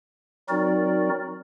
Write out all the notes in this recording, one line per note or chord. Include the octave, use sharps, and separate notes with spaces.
F#3 C4 D#4 F#4 A#4 D5